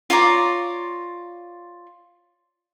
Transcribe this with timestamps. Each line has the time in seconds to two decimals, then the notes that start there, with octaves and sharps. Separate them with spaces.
0.10 F4 C#5 D5 A#5